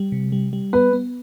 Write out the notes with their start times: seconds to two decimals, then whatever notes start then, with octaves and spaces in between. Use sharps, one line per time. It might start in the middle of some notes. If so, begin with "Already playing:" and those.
Already playing: G3
0.12 C3
0.32 G3
0.53 G3
0.73 B3 B4
0.93 B3